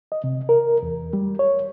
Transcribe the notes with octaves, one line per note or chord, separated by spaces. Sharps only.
D#5
C3
A#4
E2
G3
C#5